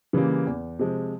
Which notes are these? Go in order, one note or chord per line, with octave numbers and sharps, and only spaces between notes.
C#3 E3 G3 A#3
E2
C3 F3 G#3